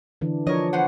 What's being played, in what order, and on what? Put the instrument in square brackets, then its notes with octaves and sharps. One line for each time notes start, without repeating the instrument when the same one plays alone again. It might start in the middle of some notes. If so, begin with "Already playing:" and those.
[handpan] D3 E3 D4
[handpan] F3 D4 C#5 [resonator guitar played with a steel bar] A#4 D#5
[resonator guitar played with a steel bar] B3 C5 F#5